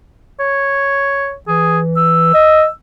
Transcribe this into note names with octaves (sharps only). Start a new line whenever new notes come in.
C#5
E3 G#4
E6
D#5